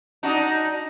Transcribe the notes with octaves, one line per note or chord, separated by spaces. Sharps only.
D4 D#4 F#4